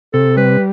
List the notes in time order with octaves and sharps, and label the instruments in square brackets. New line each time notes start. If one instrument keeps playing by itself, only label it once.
[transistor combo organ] C3 [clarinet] A4
[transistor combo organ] G3 [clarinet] B4